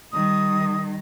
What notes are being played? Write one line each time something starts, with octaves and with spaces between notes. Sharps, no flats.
D#3 G3 D#6